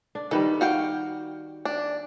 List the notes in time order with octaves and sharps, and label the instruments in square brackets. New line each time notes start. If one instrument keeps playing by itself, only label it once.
[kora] D4
[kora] D#3 G3 [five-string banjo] A4 B4
[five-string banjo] F#4 F5 G5
D4